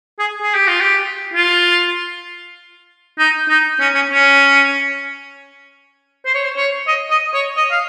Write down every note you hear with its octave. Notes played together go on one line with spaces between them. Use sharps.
G#4
G#4
G4
F4
G4
F4
D#4
D#4
C#4
C#4
C#4
C5
C#5
C5
C#5
D#5
D#5
C#5
D#5
F5